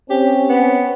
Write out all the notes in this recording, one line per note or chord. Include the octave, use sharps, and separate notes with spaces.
C4 C#4 G4
B3